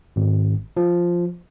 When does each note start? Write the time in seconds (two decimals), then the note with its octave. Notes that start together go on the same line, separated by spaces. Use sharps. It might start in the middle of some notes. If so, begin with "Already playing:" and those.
0.16 G#1
0.77 F3